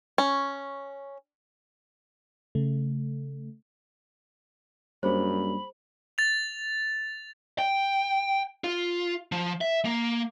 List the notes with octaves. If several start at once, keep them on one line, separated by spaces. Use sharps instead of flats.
C#4
C#3 A3
F#2 G3 A#3 D4 G#4 C5 B5
A6 F7
G5
F4
F3
E5
A#3